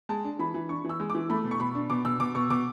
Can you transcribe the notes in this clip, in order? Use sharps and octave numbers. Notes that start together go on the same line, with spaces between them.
G#3 A5
D4
E3 B5
E3
D4 C#6
E3 E6
G#3
E3 D6
A3 B5
B2
C#6
B2 B5
D4
B2 D6
B2 E6
B2 D6
B2 C#6
B2 D6